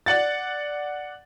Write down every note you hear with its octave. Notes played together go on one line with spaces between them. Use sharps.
D5 F#5 A6